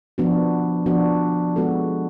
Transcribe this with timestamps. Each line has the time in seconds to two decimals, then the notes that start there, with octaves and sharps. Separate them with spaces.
0.18 F3 B3 D4 F#4
0.86 F3 B3 D4 F#4
1.56 G#3 B3 F#4 A4